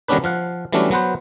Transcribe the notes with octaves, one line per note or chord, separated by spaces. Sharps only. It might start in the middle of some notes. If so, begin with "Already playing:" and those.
D#3 G3 B3 C#4 D4 B4
F3 F5 F#5
E3 F#3 G3 A3 C#4 D4
F#3 B3 B4 C5